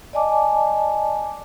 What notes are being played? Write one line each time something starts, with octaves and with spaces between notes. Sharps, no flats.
D5 D#5 G#5 A5 D6